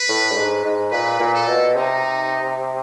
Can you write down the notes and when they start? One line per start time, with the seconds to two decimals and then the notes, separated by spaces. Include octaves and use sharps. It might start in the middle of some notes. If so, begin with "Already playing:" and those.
Already playing: B4
0.09 A2
0.31 G2
0.36 G#2
0.64 G#2
0.91 A#2 B4
1.20 A#2
1.34 A4
1.47 B2
1.76 C3 D#4